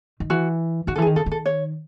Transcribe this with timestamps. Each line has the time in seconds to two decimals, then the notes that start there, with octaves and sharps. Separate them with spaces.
0.20 D#3
0.30 E3 F#4
0.87 D#3 F#4
0.96 E3 A4
1.02 G#4
1.07 D#3
1.16 C#3 A4
1.26 D#3
1.31 A4
1.46 C#5